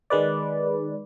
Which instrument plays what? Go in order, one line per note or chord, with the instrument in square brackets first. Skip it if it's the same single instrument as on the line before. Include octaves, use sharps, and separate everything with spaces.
[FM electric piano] D#3 G#3 B4 D5